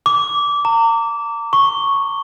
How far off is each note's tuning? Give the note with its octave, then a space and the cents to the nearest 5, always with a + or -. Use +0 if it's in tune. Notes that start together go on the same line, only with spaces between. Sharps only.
D6 -20
A#5 -35
C#6 -5